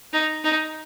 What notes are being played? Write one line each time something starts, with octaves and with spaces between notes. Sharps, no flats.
D#4
D#4